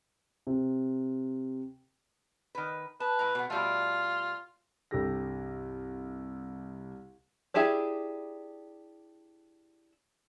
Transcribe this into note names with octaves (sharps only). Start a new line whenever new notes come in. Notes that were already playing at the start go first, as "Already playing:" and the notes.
C3
D#3 B4
B4 A5
A2 A#5
B2 B3
B2 G3 A3 F4
C2 G2 G4 A4 A#6
D4 E4 G4 G#4 E5